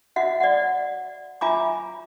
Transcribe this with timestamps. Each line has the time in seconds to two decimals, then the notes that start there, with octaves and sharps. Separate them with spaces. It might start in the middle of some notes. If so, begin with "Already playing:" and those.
0.16 F#4 D#5 E5 F#5
0.40 D5 D#5 F#5
1.41 F4 E5 G#5 A#5 B5 D6